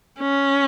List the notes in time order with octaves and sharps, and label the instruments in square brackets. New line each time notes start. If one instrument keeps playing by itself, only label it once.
[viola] C#4